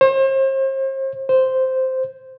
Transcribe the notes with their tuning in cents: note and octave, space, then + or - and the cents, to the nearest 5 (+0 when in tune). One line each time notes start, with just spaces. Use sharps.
C5 +40
C5 -5